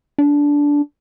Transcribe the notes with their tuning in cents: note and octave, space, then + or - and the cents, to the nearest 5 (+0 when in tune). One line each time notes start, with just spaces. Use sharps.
D4 -15